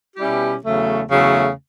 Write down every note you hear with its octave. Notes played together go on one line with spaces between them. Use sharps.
B2 G3 C#4 E4 G4
E2 C#3 F#3 A3
E2 C#3 F#3 A3